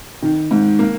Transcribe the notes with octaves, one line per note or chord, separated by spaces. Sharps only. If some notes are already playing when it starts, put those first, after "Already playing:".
D#3
G#2
A#3